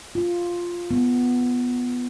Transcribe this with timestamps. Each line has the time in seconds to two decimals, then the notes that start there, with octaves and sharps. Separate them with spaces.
0.15 F4
0.91 B3